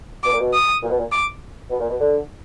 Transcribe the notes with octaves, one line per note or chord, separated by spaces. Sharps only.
B2 D6
A#2
B2
D#6
A#2
B2
A#2
D6
B2
A#2
B2
D3